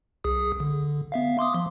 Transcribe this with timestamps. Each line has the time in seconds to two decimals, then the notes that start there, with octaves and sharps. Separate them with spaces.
0.24 C2 G#4 D#6
0.60 D3
1.12 B3 E5 F5
1.39 C6 D6 D#6
1.55 F3